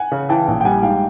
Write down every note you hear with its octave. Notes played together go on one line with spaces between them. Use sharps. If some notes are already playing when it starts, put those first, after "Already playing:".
Already playing: F#5 G#5
C#3
E3 G5 A5
A#1
G5
G3 F#5 G#5
G#2 F5 G5